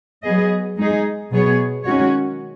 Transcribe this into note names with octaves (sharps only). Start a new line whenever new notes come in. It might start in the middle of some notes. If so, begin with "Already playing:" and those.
F#3 B3 G#4 D#5
G#3 D#4 G#4
B2 F#3 B3 G#4 C#5
D#3 G#3 C#4 F#4 C#5